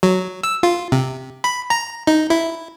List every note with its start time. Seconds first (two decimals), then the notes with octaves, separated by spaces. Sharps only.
0.03 F#3
0.43 E6
0.63 F4
0.92 C3
1.44 B5
1.70 A#5
2.07 D#4
2.30 E4